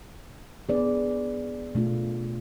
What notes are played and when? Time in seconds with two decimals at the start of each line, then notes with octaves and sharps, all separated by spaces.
0.69 B3 D4 G#4 B4 D5
1.75 B2 A3 D4 F4